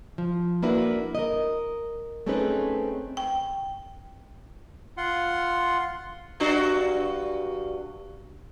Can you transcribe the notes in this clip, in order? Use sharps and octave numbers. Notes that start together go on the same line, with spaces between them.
F3
A#3 D4 E4 F#4 B4
A#4 D#5
A3 C4 C#4 D#4 G#4 B4
G5
F4 F#5 C6
G2 D4 F#4